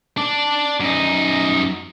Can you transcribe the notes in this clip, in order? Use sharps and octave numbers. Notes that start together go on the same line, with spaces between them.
D4 D5
F#2 D#4